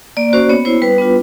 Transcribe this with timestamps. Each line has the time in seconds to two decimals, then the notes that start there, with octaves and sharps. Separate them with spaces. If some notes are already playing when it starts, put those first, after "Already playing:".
0.17 A#3 D5
0.33 C#4 F#4 C5
0.49 B3 C#5
0.65 E4 C5
0.82 G3 B4
0.98 B3 D4 F4